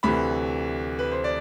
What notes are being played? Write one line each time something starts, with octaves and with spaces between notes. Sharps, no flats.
D2 C3 E3 B5
B4
C5
D5